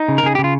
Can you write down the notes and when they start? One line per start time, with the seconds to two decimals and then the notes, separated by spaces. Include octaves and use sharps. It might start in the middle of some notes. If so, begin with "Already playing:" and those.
Already playing: D#4
0.08 C#3
0.18 A#4
0.23 C#3 G#4
0.35 C#3 G4
0.44 F4